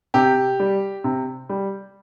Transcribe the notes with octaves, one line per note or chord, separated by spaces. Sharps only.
C3 G4
G3
C3
G3